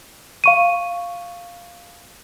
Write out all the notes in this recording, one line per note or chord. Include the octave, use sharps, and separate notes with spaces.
F5 C#6 D#7